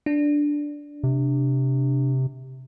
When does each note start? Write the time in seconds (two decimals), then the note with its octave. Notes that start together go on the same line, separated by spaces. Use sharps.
0.06 D4
1.04 C3